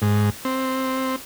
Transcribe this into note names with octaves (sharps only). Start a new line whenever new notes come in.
G#2
C4